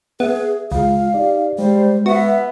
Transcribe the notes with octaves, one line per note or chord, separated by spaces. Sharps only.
B3 G#4 E5
C#2 G#3 F4 F5
D#4 G4 D5
G3 G#3 C5
B3 F#4 E5